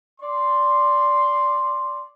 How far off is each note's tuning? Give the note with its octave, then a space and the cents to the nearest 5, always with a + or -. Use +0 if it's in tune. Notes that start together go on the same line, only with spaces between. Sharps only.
D5 -10 C6 +0